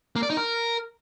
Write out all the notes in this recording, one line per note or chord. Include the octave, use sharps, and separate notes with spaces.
A#3
D5
D#4
A#4